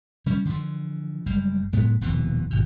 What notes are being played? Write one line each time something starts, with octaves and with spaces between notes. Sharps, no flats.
C#3 G3 C#4
D3 E3 F3
F#1 G3 G#3
F#1 A2 G#3 B3
D#1 F2 B2 E3
G#1 B2